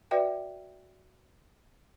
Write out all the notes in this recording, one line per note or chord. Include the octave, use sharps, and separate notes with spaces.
F#4 B4 D5 E5 G5